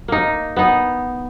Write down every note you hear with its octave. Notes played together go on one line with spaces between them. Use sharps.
A#3 D#4
B3 D#4